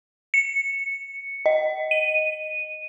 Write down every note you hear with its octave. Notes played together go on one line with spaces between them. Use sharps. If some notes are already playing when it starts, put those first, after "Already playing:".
C#7
D#5
D#7